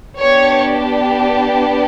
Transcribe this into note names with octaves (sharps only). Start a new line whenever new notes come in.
B3 D4 G4 C#5